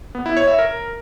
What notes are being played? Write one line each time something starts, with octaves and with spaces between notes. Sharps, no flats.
B3
E4
C#5
E5
A#4